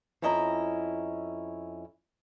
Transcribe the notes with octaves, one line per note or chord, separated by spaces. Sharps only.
F2 C#4 E4 D#5 G#5 A#5